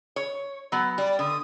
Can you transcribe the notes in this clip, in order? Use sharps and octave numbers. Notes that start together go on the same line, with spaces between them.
C#5
F#3 B3
G3 D5
D3 D#6